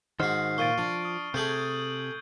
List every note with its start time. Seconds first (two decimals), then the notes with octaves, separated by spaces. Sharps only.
0.20 G#2 D#3 D#4 F#4 C5 F6 C7
0.58 A#2 C#6 A6 D7 D#7 G7
0.78 F3 D4
1.05 D#6
1.34 C3 A3 G#4 A4 G6 G#6 F#7